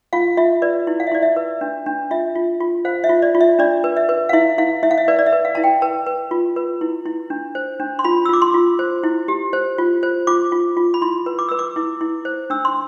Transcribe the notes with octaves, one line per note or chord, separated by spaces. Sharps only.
F4 F5
F4 E5
B4 D5
E4
F5
E5
E4 D5
E5
B4
D4
D4
F4 E5
F4
F4
C5 F5
E5
F4
D5
F4
E5
D4 D5
B4
E5
B4
F5
E4 E5
E4 F5
E4 E5
F5
E5
B4 D5
D5
E5
B4
F5
E4 A5
G5
B4 A5
B4
F4
B4
E4
E4
D4
C5
D4
C6
F4 B5
E6
F4 D6
C6
F4
C5
E4
G4
C5
F4
C5
F4 D6
F4
F4
B5
E4 C6
B4
D6
B4 E6
D6
E4
E4
C5
D4 E6
C6